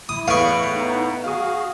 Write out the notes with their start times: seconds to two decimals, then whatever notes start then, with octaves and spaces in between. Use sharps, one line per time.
0.09 E4 D#6
0.28 E2 A2 B4 F5 B5 C#6 D7
0.75 B3 D#4
1.24 F#4 G#4 F5 D#6